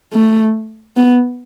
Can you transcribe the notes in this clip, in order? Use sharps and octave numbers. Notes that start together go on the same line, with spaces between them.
A3
B3